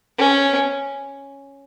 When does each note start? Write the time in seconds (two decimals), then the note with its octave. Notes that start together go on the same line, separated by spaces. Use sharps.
0.18 C#4